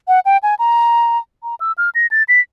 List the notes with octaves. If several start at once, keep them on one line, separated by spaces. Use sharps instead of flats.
F#5
G5
G#5
A#5
A#5
E6
F6
A#6
A6
B6